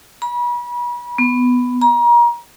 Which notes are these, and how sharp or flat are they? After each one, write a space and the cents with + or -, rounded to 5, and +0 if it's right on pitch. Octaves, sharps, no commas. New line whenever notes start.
B5 -35
B3 +5
A#5 +30